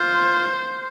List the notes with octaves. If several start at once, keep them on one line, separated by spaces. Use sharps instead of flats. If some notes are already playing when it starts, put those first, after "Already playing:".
Already playing: F4 C5